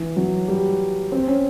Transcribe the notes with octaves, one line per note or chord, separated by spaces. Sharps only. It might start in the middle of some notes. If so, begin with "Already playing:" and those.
Already playing: E3
F#3
G3
C4
C#4